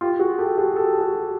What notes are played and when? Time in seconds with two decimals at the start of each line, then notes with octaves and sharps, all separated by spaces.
0.01 F4 G4
0.19 F#4 G#4
0.38 G4 A4
0.58 F#4 G#4
0.76 G4 A4
1.00 F#4 G#4